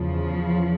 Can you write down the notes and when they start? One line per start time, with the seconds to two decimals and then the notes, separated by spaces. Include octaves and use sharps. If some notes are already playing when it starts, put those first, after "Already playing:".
Already playing: E2 C#3 F3